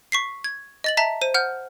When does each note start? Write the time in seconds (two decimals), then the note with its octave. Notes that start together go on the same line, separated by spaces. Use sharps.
0.12 C#6 B6 C7
0.44 G#6
0.84 D#5 A6 F#7
0.97 E5 A5 A#5 B6
1.22 C5 D#7
1.34 F#5 F6 G6